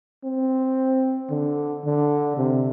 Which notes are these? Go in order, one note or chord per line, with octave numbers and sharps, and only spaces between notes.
C4
D3
D3
C3